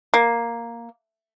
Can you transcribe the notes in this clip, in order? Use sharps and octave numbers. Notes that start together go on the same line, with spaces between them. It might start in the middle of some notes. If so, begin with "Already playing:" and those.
A#3